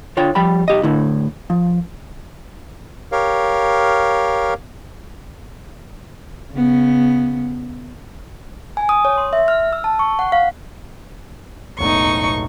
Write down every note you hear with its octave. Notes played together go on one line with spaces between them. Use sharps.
D3 F4 C#5 G5
F3 G3 G5 B5
B1 G4 D#5
A2 D3 E4
F3
G4 A#4 C#5 F5
C#3 B3
G#5
D#6
C#5
C6
E5
F6
E6
A5
C#6
F#5
F5
E1 B1 A2 D#4 C#6